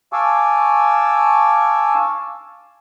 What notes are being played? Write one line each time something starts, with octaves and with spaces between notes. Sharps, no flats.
F5 G#5 A5 C#6 D6 E6